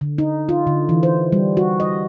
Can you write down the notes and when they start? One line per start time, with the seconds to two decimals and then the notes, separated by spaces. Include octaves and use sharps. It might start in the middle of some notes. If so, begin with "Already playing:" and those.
0.01 D3
0.18 D#4
0.49 F4
0.67 D3
0.89 E3
1.03 C5
1.32 G3
1.57 F#4
1.80 D#5